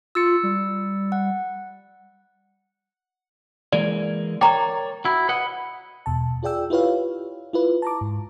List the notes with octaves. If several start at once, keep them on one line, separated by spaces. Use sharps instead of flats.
F4 E6 A6 C#7
G3
F#5
E3 G#3 A#3 D5
A#4 C#5 D5 G5 A#5 C#6
E4 F#4
B4 D#5 F#5
E2 B2 A5
F4 G#4 D5 G5 E6
E4 F4 G4 B4 C#5 F5
E4 F4 B4
A5 A#5 D6
G#2